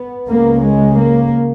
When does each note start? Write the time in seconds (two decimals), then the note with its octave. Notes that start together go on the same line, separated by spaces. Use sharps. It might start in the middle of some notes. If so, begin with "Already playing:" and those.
Already playing: B3
0.28 C#2 C#3 A#3
0.63 G#3
0.96 A#3